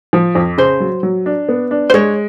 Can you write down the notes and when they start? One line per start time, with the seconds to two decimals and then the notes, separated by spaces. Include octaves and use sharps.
0.13 F3
0.35 F2
0.58 C#3 C5
0.80 F#3
1.03 F#3
1.26 D4
1.49 B3
1.71 D4
1.90 C5
1.94 G#3 C#5